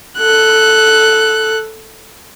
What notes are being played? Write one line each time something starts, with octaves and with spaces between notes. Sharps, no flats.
A4 F#6